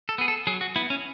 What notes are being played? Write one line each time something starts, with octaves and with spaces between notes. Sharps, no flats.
A4
B3 G#4
A4
F#3 G#4
F#4
B3 E4
C#4